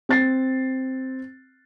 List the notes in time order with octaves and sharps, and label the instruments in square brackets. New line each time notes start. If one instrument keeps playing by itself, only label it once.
[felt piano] C4 A6 C7